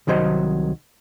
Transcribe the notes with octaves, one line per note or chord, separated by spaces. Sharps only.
C2 D#3 F#3 C5 D#5